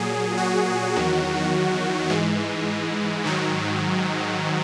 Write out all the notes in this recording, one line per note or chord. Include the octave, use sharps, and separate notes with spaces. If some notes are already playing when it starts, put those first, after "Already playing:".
Already playing: A#2 F#3 G#4
F#4
E2 D#3 F#3
G#2 E3 G#3
G#2 D#3 F#3